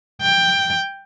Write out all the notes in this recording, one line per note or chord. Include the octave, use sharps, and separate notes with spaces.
G5